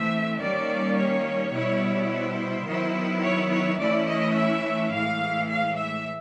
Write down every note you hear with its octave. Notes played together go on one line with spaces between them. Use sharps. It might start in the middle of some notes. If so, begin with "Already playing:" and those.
Already playing: E3 A3 C4 E5
D#3 G3 A#3 C#4 D5
C#5
B2 G3 B3 E4
C5
D#3 F#3 B3 E4
C#5
C#5
E3 A3 C#4 E4 D5
D#5
E5
A2 E3 G#3 F5
F5
E5